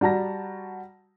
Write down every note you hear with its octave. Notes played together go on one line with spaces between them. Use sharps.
G3 F#4 A5 A#5 A#6